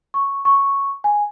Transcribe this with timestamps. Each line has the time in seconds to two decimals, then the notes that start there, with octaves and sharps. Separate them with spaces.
0.14 C#6
0.45 C#6
1.04 G#5